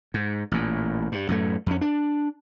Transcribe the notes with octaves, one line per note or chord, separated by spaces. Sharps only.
G#2
A1 A#2
G2
F#2 A2 A3
F2 C#4
D4